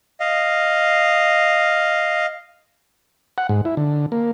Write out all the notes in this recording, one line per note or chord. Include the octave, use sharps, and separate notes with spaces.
D#5 F5
F#5
G#2
E4
D3
A#3